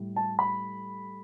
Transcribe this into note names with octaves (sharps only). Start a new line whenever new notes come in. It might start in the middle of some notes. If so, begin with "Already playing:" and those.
Already playing: A2 G3
A5
B5